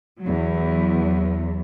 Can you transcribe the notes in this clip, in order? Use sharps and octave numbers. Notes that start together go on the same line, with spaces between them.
E2 F#3